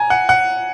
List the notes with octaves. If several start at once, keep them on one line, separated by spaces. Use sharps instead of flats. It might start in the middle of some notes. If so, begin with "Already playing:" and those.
Already playing: G#5 A#5
F#5
F#5